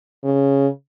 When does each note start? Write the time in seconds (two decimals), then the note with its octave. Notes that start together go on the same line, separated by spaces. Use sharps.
0.24 C#3